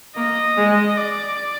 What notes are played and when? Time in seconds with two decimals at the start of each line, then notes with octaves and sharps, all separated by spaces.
0.16 A#3 D#5
0.57 G#3
0.97 D5